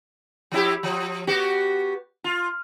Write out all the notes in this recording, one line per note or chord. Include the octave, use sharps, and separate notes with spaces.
F3 E4 G4
F3
B3 F#4 G4
F4